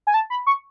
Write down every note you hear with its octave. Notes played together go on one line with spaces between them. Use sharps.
G#5
A5
B5
C#6